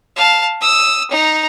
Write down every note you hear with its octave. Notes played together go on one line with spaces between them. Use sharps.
F5 A5
D#6 E6
D#4 A#5